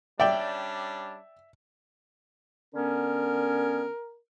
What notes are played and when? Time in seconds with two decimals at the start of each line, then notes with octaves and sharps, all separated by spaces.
0.20 G3 C#4 D4 D5 E5 G5
2.75 D3 B3 C#4 A#4